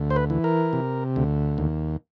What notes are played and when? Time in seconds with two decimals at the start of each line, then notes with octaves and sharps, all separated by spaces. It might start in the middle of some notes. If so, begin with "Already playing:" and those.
Already playing: D2
0.10 C5
0.16 B4
0.30 E3
0.44 A#4
0.73 C3
1.16 D2
1.58 D#2